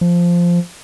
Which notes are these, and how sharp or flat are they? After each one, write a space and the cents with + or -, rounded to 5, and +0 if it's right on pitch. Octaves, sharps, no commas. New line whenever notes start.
F3 -5